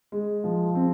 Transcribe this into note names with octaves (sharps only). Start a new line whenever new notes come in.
G#3
F3
C4